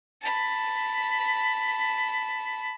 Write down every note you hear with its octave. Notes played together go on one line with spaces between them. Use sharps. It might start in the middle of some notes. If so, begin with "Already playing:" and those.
A5 B5